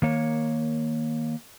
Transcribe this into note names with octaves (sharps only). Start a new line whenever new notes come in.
D#3 A#3 C#5